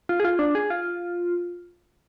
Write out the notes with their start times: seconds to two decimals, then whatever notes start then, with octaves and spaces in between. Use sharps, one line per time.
0.09 F4
0.20 G#4
0.25 F4
0.39 D4
0.55 G#4
0.70 F4